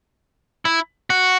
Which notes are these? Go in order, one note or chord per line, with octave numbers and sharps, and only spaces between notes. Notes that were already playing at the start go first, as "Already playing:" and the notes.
E4
F#4